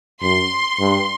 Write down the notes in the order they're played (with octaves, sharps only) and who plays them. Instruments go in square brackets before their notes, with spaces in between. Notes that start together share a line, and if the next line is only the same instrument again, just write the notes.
[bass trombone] F#2 [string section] C6
[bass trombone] G2